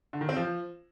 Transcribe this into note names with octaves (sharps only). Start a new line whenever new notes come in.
D3
D#3
C4
F3